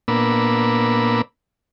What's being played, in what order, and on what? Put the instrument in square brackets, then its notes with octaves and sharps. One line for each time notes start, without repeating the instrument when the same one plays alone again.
[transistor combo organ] A#2 A#3 B3 D4 B5 E6